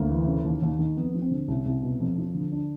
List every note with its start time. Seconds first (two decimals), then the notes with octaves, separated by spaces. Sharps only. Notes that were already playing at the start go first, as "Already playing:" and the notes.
Already playing: D2 A#3
0.10 E3
0.27 C#3
0.44 D#2
0.62 D#2
0.79 D#3
0.97 F2 B3
1.14 F3
1.22 C4
1.31 D3
1.48 C2 C#4
1.65 C2
1.82 B2
2.00 F2
2.18 F3
2.35 D3
2.52 D4